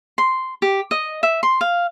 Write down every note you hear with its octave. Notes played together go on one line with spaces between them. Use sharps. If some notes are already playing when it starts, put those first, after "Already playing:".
C6
G4
D#5
E5
C6
F5